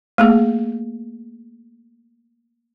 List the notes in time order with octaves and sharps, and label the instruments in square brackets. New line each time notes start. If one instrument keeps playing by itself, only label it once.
[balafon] A3 A#3 G#4